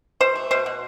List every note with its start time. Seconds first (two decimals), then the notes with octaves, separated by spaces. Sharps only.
0.20 B2 C5
0.36 A3
0.51 B2 C5
0.66 B2